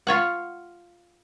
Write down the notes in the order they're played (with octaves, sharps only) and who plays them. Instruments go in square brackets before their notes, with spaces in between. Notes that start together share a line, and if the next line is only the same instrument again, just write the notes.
[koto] F4 C#5 F#5